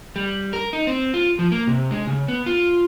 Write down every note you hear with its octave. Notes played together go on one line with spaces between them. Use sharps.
G3
A#4
D#4
C4
F4
F3
A#3
C3
G#3
C#3
B3
F4